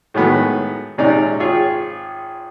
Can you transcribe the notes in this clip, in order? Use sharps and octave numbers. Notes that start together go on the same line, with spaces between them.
A2 D#3 F#3 G#3 A3 B3
A#1 C3 G#3 C#4 D#4 D5
G#1 F4 G#4 C#5